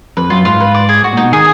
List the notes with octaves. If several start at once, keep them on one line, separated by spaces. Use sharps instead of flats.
F2 B4
F#2 F4
G#2 F4
B4
D5
G#4
G#2 F#4
A#2
D#4
B2
D#3 G#4